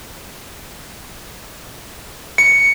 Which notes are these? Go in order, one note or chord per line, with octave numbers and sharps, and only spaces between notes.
C#7